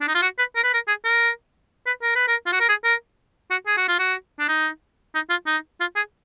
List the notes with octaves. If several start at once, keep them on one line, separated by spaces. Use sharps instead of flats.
D4
D#4
F4
F#4
B4
A#4
B4
A#4
G#4
A#4
B4
A#4
B4
A#4
F4
F#4
A#4
G#4
A#4
F#4
G#4
F#4
F4
F#4
D4
D#4
D#4
F4
D#4
F4
G#4